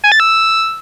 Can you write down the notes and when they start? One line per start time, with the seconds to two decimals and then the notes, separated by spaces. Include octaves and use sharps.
0.04 G#5
0.12 A6
0.20 E6